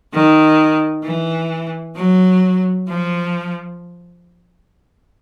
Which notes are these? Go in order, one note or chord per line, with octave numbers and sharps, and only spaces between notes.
D#3
E3
F#3
F3